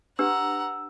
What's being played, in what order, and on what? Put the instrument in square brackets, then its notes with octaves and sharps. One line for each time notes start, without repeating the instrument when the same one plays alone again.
[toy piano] D4 G4 B4 [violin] F#5 A#5 [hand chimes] E6